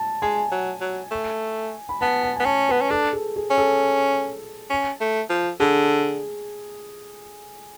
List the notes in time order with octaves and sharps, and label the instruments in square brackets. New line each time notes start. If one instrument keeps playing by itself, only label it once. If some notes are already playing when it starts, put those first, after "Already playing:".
Already playing: [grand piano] A5
[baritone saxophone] G#3 [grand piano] G#5
[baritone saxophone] F#3
F#3
A3
[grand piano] B5
[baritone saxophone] B3 [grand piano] A5
[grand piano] A5
[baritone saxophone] B3 [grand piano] G#5
[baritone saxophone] C#4 [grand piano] A5
[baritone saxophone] B3 [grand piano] B4
[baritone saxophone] C#4
[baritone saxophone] D4 [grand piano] A4
[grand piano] G#4
G#4
[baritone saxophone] C#4
[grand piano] A4
[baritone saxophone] C#4
A3
F3
[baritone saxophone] D3 [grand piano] G#4